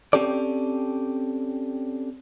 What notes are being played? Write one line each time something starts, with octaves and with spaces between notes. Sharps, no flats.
C4 C#4 G4 A4 D5